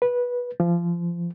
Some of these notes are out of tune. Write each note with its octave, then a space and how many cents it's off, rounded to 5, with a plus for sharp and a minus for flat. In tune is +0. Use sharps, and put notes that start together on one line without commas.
B4 -15
F3 -25